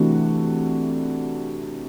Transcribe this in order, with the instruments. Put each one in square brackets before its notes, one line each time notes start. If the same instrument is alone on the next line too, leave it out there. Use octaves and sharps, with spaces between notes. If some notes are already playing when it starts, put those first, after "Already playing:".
Already playing: [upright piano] C3 E3 A3 D4 F#4